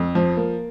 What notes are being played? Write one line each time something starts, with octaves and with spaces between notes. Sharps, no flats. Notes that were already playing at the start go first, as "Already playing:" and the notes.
Already playing: F2
F3
A#3